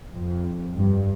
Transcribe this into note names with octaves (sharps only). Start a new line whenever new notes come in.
F2
G2